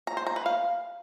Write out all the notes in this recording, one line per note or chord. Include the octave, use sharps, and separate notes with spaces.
A#5
C5
A#5
B4
F5